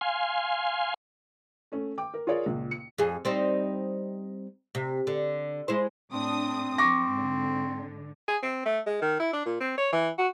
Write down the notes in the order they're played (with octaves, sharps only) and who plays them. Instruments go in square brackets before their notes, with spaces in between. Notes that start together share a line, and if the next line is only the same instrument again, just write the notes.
[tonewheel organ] F5 G#5 C6
[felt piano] A3 C#4
G5 D6
A#4
F4 G#4 A#4 C#5 D5
C#2 A#2
C#7
[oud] F2 G#4
G3 C4 D#4
C3
D3
G#3 E4 C5
[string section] A2 D4 D#6 [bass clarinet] C4
[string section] F2 [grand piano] C#6 D6 A#6
[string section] G#2 D3
[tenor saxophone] G#4
C4
A3
G#3
D#3
E4
D4
A#2
C4
C#5
E3
F#4